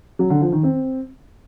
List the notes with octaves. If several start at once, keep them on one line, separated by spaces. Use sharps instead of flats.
F#3
D3
F3
D#3
C4